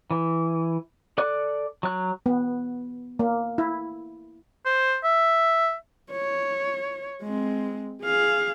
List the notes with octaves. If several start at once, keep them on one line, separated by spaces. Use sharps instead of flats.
E3
A4 D5 D6 F#6
F#3 F#6
B3
A#3
E4
C5
E5
C#5
G#3 C4
G#4 F5